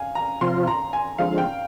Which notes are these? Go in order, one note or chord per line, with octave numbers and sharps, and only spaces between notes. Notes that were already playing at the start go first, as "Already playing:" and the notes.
Already playing: F5 G#5
A#5
C3 F3 C4 F4 C6
A#5
G#5
D3 F3 G#3 C4 F5
G5